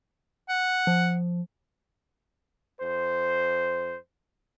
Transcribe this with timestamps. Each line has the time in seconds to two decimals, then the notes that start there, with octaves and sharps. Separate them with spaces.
0.49 F#5
0.87 F3
2.81 F2 C5